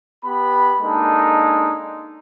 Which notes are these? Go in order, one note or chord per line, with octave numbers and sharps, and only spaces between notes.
B3 G4 B5
G#3 A#3 D4 D#4 A4